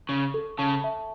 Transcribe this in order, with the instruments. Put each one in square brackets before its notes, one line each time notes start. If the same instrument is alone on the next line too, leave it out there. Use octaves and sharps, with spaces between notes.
[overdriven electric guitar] C#3 [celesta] C#6
[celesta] A4
[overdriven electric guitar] C#3 [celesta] A5
[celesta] E5